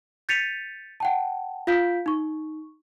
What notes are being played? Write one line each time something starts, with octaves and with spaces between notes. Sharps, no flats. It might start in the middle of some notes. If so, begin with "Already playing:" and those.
G6 A6 B6 C#7 D#7 F7
F#5 G5 A5
F4 F5 G6 B6 D7
D#4 C#6